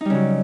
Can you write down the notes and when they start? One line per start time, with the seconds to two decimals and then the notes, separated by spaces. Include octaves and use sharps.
0.01 D#4
0.05 G3
0.10 C#3
0.15 F#3